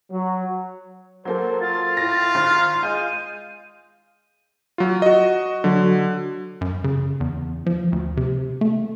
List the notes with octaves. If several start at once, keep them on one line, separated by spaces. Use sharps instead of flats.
F#3
F#3 A#3 A4 C5
F4 A6
A2 A#6
G#1 F6
G#3 F5 G6 D#7
F#3 F4
F#4 D#5
D3 F#3
F#2
C#3
E2
F3
D2
C3
A3